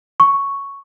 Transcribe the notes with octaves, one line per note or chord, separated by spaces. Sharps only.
C#6